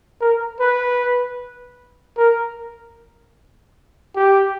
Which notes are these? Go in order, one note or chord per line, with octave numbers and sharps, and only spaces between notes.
A#4
B4
A#4
G4